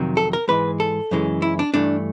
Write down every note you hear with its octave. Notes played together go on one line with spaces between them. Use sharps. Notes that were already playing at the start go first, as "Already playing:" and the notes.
Already playing: F2 C3 D#3 F#3
A4
A#4
G#2 E3 G#3 B4
A4
F#2 C#3 E3 G#3
E4
D4
G2 E3 A3 D4